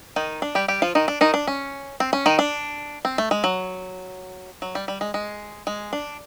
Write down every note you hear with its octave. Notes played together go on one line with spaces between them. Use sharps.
D#3 D#4
D4
G3 G4
G3 G4
F3 F4
D#3 D#4
D4
D#3 D#4
D4
C#4
C4
C#4
D#3 D#4
D4
C4
A3
G#3
F#3
F#3
G3
G3
G#3
G#3
G#3
D4